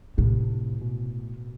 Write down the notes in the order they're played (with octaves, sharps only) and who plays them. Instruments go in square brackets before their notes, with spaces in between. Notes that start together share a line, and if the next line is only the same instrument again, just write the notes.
[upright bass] A2 [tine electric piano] C3
[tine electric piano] B2